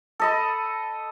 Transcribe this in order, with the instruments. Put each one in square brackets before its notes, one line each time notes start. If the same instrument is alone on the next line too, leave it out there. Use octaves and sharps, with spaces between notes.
[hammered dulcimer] A4 D#5 B5